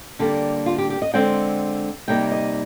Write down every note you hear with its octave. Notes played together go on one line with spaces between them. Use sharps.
D3 G3 A#3 G4
F4
G4
G4
D#5
D3 G#3 C4 G5
C3 G3 A#3 D#4 G5
D#5